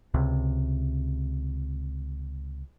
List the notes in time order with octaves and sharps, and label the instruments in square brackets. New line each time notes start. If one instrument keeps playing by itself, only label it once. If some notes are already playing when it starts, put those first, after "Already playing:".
[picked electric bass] C#2 C3